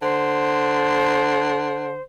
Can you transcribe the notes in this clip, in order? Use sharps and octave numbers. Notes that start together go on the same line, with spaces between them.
D3 C5